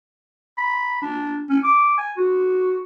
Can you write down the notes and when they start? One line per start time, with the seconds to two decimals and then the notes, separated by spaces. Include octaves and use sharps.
0.58 B5
1.02 D4
1.49 C#4
1.64 D6
1.98 G#5
2.17 F#4